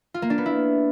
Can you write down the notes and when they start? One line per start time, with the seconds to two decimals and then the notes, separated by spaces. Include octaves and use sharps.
0.14 F4
0.22 A#3
0.30 D4
0.38 B3
0.46 E4